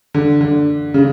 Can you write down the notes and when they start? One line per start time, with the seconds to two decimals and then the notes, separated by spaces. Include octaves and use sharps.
0.14 D3
0.41 D3
0.94 C#3